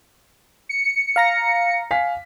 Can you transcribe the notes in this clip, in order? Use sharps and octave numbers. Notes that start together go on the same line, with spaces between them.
C#7
F5 A#5 A#6
F5 G#5 B6